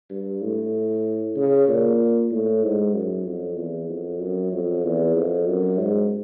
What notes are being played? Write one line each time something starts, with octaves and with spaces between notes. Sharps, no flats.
G2
A2
C#3
A#2
A2
G#2
F#2
F2
E2
F2
F#2
F2
E2
F2
F#2
G#2